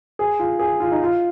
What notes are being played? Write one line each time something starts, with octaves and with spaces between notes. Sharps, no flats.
G#4
F4
G#4
F4
D#4
F4